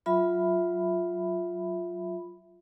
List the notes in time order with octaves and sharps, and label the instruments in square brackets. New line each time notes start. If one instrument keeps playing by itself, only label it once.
[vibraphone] F#3 F4 E5 B5